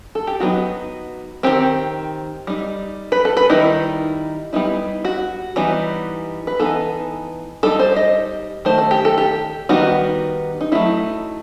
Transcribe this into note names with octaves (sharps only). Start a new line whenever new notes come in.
A4
G4
F#3 B3 D#4 F#4
D#3 F#3 C4 G4
G3 D#4
B4
A4
B4
D#3 G3 D#4 E4
G3 B3 D#4 E4
F#4
E3 G3 B3 D#4
B4
E3 B3 D#4 A4
G3 D#4 A4
C5
D#5
D#3 A3 D#4 C5
A4
G4
A4
G4
D#3 G3 B3 D#4 F#4
D#4
F#3 A3 C4 D#4 E4